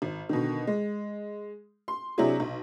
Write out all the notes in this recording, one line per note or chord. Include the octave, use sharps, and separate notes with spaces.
G#1
B2 D3 D#3
G#3
C6
C3 F#3 D4 E4 G#4
B1